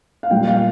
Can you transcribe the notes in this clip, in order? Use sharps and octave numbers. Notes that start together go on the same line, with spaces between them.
F5
A#2 G3 G5
F5